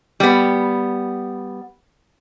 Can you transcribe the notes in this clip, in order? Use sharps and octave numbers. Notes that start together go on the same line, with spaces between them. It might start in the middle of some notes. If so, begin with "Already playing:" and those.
G3 B3